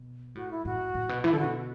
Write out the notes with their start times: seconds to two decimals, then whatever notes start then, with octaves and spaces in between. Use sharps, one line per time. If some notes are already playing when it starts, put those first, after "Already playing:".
Already playing: B2
0.35 A2 F#4
0.51 E4
0.65 A2 F#4
0.95 A2
1.09 B2
1.24 E3 E4
1.32 D3 A4
1.38 F#4
1.44 B2